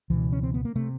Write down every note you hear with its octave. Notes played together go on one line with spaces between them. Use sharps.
C#2 B2 E3
C#4
C4
B3
A#3
C3 A3